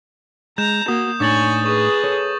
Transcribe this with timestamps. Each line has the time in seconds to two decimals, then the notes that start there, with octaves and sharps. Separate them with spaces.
0.58 G#3 A#5 G6 E7
0.88 A#3 F#4 D#6
1.20 A2 D4 D#4 C#5 G#5 D6 A6 F#7
1.66 G#4 B4 C#6
2.04 A4 C#5